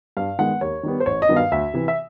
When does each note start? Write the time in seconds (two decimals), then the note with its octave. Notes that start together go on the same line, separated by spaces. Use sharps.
0.17 G2 F5
0.38 D#3 G#3 B3 F#5
0.61 D#2 C#5
0.83 D#3 G3 B3
1.00 C5
1.06 A1 C#5
1.22 D#5
1.29 G2 D#3 F#3 B3
1.36 F5
1.51 D2 E5
1.74 C3 E3
1.88 E5